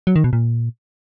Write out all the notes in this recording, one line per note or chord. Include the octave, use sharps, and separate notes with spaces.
F#3
D#3
B2
A#2